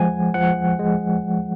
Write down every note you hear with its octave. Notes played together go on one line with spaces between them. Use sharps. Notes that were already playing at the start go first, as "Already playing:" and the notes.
Already playing: F3 G#3 F#5 G#5
F3 F#5
G#3